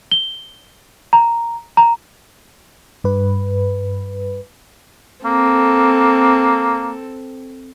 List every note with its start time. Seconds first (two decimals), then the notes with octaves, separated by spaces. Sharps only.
0.11 G7
1.13 A#5
1.77 A#5
3.04 G2 B4
5.25 A#3 C4 A4